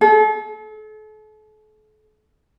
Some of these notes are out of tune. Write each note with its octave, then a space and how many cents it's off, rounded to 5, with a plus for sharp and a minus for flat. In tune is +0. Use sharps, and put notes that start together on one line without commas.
A4 -40